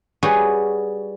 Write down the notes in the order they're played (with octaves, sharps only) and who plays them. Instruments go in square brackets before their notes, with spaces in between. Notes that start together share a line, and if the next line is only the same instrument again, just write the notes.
[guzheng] G3 F#4 G#4 B4 C#5